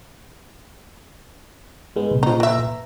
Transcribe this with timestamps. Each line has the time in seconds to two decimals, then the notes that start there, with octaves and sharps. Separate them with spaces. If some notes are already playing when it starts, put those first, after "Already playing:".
1.96 G#2 G#3 B3
2.11 C2 A#2
2.23 C#3 F3 D#4
2.40 E3 E5 A#5